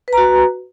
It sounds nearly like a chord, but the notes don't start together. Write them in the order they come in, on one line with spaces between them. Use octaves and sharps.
B4 A#5 F#4